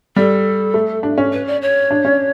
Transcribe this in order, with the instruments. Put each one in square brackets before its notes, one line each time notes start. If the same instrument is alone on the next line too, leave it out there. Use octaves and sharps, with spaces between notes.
[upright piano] G3 [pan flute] A4
[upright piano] A3
D4
C#4
[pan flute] B4
D5
C#5
[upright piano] D4
C#4